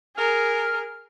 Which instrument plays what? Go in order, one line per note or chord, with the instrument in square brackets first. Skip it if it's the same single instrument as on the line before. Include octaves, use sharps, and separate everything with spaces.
[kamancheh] G#4 A#4 [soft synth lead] F6